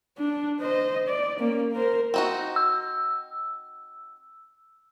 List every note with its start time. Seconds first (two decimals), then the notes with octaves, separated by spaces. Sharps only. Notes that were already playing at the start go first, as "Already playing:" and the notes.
0.18 D4
0.60 C5 D#5
1.08 D5
1.39 A#3 C#4
1.72 A#4 C5
2.14 C4 D#4 F#4
2.56 E6